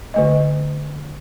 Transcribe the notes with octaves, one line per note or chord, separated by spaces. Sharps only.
D3 A3 D#5